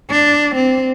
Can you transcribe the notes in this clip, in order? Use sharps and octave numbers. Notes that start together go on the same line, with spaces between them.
D4
C4